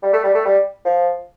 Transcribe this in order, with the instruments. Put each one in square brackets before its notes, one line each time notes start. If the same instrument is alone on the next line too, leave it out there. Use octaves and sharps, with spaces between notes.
[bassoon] G3
A3
G3
A3
G3
F3